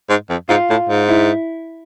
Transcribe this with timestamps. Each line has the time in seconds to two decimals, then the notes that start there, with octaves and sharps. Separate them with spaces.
0.09 G#2
0.30 F2
0.49 G#2 F4
0.70 A2
0.89 G#2
1.09 E4